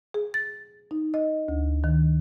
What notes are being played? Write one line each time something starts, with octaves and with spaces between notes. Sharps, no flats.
G#4
A6
D#4
D#5
D2
D#3